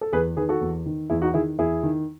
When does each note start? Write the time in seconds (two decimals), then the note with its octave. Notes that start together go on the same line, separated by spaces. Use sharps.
0.01 A4
0.13 E2 G#4 B4
0.37 D#3 G#4 B4
0.49 F#4 A4
0.61 E2
0.86 D#3
1.10 E2 E4 G#4
1.22 D#4 F#4
1.34 D#3 E4 G#4
1.58 E2 E4 G#4
1.83 D#3